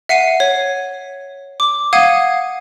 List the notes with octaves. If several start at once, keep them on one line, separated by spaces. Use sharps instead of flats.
E5 F#5 C7 D#7
C#5
D6
F5 F#5 D#6 G#6 D#7